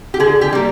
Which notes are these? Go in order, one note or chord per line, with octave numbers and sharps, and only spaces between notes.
G4
D3 G#4
G4
G3 A#3